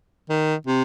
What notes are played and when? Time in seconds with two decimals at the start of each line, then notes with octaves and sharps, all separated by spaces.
0.29 D#3
0.67 C3